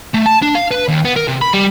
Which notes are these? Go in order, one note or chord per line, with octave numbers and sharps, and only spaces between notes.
A3
A5
D4
F5
B4
D#2
B3
A#4
C3
B5
G3